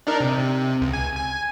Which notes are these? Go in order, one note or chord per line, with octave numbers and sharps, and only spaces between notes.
D4 D#4 A#4
C3
C#2
G#5
G#5